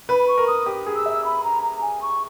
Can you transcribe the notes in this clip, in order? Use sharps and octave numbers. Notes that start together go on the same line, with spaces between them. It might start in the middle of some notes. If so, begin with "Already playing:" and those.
B4 B5
B5
C#6
A#4
D#6
G4
G#4
E6
E5
B5
A#5
A#5
G#5
C#6